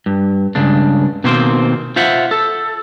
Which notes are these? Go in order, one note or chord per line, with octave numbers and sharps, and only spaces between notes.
G2
C#2 G2 C#3 D4
B2 D#3 A#3 C4 C5
F4 C5 E5 F#5
A4